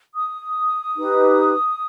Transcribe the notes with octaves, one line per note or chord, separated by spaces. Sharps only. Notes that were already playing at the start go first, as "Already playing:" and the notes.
D#6
D#4 G4 B4